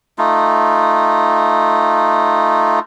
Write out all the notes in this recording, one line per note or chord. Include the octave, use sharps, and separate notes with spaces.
A3 D#4 F4